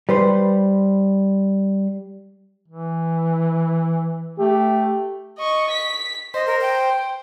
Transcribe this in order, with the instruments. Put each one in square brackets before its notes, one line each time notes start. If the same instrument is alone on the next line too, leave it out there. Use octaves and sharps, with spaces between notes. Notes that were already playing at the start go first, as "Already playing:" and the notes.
[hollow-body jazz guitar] G3 B4 C5
[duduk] E3
[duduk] A3 [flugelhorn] G4
[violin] D#5 C#6
B6
[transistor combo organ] C5 [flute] D#5
[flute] A#4
G5